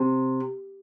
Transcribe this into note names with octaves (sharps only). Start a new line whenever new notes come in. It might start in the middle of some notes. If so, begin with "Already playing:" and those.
Already playing: C3